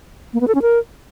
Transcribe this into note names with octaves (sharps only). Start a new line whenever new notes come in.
A#3
B3
A4
C#4
A#4